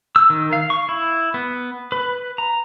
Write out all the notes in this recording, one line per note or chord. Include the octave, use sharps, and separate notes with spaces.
E6
D#3
F5
C#6
E4
B3
B4
A#5